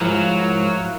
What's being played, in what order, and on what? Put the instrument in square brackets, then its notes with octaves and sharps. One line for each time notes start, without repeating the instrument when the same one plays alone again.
[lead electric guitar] G#2 [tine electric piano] F3 [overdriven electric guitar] F#3 [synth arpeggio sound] E4 A#4 F5